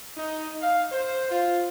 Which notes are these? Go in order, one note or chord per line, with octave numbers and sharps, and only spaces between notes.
D#4
F5
C5
F4